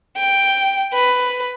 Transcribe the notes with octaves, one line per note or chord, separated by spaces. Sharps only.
G5
B4